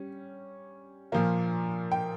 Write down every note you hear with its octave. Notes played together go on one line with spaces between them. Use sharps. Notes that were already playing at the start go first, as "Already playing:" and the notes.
Already playing: G3 C#4
A#2 F3 A#3 F4
G5